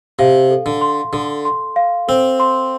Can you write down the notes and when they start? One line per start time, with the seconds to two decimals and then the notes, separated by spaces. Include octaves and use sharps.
0.19 C3 F5
0.50 A4
0.66 D3
0.81 C6
1.13 D3 A4
1.45 C6
1.76 F5
2.08 C4 A4
2.40 C6